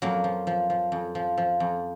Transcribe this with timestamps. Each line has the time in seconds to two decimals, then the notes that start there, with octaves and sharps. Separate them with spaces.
0.02 F2 F#3 A#3
0.24 F3
0.47 F3
0.70 F3
0.92 F2
1.15 F3
1.37 F3
1.60 F2